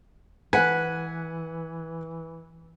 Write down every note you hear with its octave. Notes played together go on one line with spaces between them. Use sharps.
E3 B4 F#5 G#5